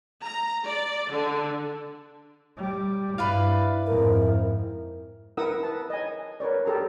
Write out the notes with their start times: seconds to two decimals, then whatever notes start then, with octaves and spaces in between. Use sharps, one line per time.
0.24 A#5
0.65 D5
1.11 D3
2.57 G3
3.18 G2 E4 B4 D5 F5
3.87 F2 G#2 A#4
5.37 E4 A#4 B4 F#5 D#6 E6
5.63 B4 A5
5.90 D#5 G#5
6.40 A#4 B4 C#5 D5
6.65 G4 A4 A#4 A#5